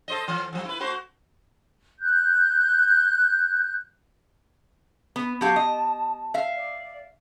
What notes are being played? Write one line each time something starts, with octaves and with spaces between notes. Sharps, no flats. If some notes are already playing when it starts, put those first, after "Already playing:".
A4 C5 D#5
E3
F3 F#3
E4 B4
A3 F#4 C5
F#6 G6
B3
F#3 G4 F5 A5
D#5
E5 F5
D5